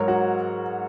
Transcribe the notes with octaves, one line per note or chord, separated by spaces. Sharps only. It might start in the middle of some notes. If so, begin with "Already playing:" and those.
Already playing: G#2 F#3 A#4 C#5
F#4